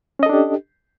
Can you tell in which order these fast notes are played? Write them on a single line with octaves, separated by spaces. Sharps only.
C#4 D#5 A4 D4 G4